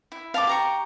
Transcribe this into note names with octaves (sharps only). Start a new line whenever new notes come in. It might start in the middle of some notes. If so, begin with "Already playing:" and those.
E4
F5 A5 B5 D6
G4 A#5 C#6